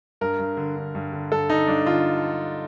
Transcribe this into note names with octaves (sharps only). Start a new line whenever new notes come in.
G2 A#4
G2
D3
D3
G2
D3
G2 A4
D3 D#4
G2 D4
D3 F4